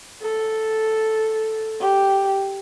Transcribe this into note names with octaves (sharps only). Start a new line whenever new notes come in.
A4
G4